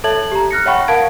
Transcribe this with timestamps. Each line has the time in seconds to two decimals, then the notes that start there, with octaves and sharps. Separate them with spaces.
0.04 A4 C#5 E5 A5 G#6 F#7
0.32 G4 A#5
0.51 F6 F#6 A#6 C#7
0.66 C#5 E5 F#5 G5 B5 C#6
0.88 A#4 F5 F#5 A5 G#6 D7